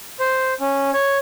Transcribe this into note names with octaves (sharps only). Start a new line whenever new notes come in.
C5
C#4
C#5